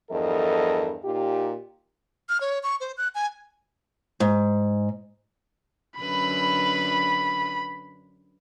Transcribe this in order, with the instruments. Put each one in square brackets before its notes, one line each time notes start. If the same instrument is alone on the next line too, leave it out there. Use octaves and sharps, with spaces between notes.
[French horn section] E2 G2 F3 A4 A#4 D#5
A#2 D#4 F4 G4
[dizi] F6
C#5
C#6
C5
F#6
G#5
[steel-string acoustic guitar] G#2
[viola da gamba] F#2 D3 B4 [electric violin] B5